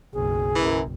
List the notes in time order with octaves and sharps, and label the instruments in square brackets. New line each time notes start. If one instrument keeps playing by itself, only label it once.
[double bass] F#1 B1 [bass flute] G#4
[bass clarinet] F#2 [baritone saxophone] E3